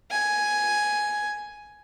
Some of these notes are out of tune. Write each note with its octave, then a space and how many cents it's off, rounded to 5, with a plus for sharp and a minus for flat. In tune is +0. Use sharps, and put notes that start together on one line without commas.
G#5 +5